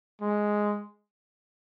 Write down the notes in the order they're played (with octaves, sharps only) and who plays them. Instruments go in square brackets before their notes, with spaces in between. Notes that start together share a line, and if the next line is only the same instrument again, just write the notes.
[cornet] G#3